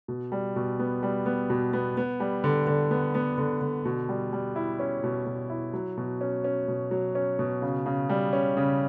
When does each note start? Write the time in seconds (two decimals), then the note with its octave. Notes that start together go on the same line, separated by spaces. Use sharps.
0.08 B2
0.32 G3
0.56 B2
0.79 B3
1.03 G3
1.26 B3
1.50 B2
1.73 B3
1.97 B3
2.20 G3
2.44 D3
2.67 D3
2.91 B3
3.15 B3
3.38 D3
3.61 D3
3.85 B2
4.09 G3
4.33 G3
4.56 E4
4.79 C#4
5.04 B2
5.26 B2
5.50 E4
5.73 F#3
5.97 B2
6.21 C#4
6.44 C#4
6.68 B2
6.91 F#3
7.15 C#4
7.39 B2
7.62 C#3
7.86 C#3
8.09 G3
8.33 C#4
8.57 C#3